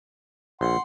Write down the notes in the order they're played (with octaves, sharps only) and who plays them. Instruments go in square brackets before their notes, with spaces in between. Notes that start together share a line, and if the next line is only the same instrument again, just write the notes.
[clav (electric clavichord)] A#1 [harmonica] F#5 C6